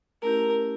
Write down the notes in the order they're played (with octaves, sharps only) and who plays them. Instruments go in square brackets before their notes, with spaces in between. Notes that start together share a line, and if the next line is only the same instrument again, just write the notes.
[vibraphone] A3 C#4 E4 G4 [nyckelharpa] A#4